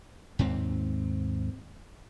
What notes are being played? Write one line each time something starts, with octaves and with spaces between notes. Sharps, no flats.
D#2 G#2 C4